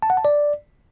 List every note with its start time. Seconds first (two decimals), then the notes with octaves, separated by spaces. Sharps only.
0.02 A5
0.10 F#5
0.17 A5
0.25 D5